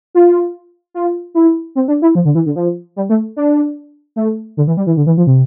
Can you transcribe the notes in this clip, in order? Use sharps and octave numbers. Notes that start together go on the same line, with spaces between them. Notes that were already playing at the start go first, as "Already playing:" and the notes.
F4
F4
E4
C4
D4
E4
F3
D3
E3
D3
F3
G3
A3
D4
A3
D3
E3
G3
E3
D3
E3
F3
C3